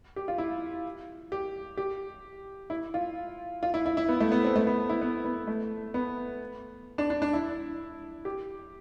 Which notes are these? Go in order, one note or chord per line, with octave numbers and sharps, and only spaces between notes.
G4
F4
E4
G4
G4
E4
F4
F4
E4
E4
E4
B3
A3
B3
C4
A3
B3
E4
B3
B3
A3
B3
D4
D4
D4
E4
G4